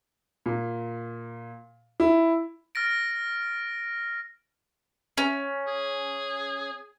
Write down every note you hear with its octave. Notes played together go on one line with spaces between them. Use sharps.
A#2
E4
F6 A6 A#6 D7
C#4
G#4